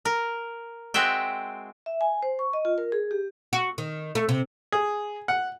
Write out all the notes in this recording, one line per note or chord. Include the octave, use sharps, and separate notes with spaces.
A#4
G#3 C4 F#4 E5 G5
E5
G#5
C5
C#6
D#5
F4
A#4
G#4
G4
F#4
D#3
A3
C3
G#4
F#5